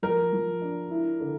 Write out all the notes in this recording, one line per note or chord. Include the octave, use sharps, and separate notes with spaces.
F3 A#4
F3
D4
E4
D3